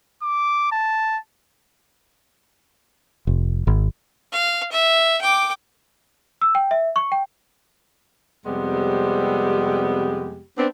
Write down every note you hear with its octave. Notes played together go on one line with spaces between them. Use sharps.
D6
A5
F1
G#1
F5
E5
G5 D6
E6
G5
E5
C#6
G5
F2 C3 G3 G#3 B3 G4
B3 C4 D4